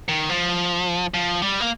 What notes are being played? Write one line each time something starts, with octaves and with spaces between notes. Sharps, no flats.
D#3
F3
F3
G3
A#3